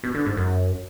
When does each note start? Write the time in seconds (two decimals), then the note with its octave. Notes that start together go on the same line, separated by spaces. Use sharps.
0.04 B2
0.15 D3
0.26 G#2
0.37 F#2